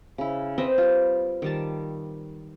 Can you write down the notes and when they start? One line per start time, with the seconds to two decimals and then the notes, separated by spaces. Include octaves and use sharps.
0.18 C#3 E4
0.58 C4 B4 D#5 E5
0.78 G3 F4
1.42 D#3 G3 A5